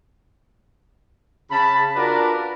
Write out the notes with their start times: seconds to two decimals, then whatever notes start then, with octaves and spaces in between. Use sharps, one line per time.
1.51 C#3 A5 B5
1.96 D4 F4 F#4 A#4 B4 D5